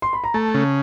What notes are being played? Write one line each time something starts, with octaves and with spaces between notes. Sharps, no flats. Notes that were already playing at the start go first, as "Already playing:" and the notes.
C6
B5
A#5
A3 A5
C#3